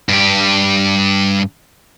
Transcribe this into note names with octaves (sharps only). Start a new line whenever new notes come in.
G2 G4